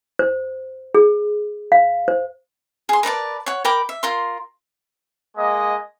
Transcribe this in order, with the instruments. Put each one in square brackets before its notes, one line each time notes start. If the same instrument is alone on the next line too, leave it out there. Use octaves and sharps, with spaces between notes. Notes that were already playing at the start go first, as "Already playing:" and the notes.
[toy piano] C5
G#4
F5
C5
[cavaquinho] G#4 C6
A#4 B4 D5 A5
C#5 F#5
A#4 G5 B5 D6
E5
F4 A#4 C6
[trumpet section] G#3 A#3 D#5